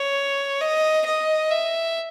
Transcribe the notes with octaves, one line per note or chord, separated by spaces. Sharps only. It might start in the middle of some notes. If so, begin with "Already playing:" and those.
Already playing: C#5
D#5
D#5
E5